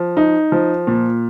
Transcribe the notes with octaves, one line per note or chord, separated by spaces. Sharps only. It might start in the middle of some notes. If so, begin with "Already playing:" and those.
Already playing: F3
D#4
F3
A#2